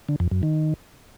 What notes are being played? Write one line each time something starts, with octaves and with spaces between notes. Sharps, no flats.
D3
F2
F#2
D#3